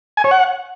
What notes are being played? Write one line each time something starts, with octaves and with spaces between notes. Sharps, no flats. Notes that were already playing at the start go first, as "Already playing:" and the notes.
G#5
C#5
F#5